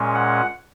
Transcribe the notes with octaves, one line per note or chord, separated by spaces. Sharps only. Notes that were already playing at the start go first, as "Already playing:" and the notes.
Already playing: A#2 G#3 C#4
F#5